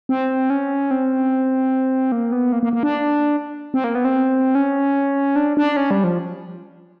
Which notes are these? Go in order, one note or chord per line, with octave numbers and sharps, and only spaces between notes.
C4
C#4
C4
A#3
B3
A#3
A#3
A#3
D4
C4
A#3
B3
C4
C#4
D4
D4
C#4
G3
F3